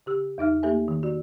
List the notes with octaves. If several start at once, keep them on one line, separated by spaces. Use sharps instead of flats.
C#3 G4 E6
E2 D#4 E5 F6
A3 A#3 G4 A4 E5 G#5
D#3
F#4 D5